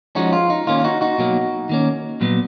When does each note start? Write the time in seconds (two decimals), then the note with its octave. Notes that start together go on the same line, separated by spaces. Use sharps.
0.15 F3 G#3 C#4 D#4 F#4
0.33 F4
0.50 D#4
0.67 D#3 A#3 C#4 F4
0.79 F4
0.84 D#4 F#4
1.01 D#4 F#4
1.18 B2 F#3 A#3
1.69 D#3 A#3 C#4
2.21 A#2 F#3 B3